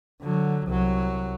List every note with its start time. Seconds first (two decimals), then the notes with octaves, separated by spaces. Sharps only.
0.22 D3 F#3
0.67 C2 F#3